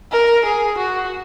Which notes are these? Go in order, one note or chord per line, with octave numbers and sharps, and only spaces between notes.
A#4
G#4
F#4